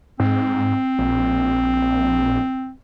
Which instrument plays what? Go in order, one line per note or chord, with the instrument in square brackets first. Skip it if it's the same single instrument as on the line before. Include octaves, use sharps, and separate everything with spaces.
[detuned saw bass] G#2 [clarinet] C4
[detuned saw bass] A#1